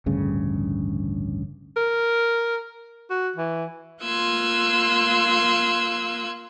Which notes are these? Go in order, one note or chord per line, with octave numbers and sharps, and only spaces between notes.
A1 D2 G2 C#3
A#4
F#4
E3
A#3 F4 C6 E6 F#6 G#6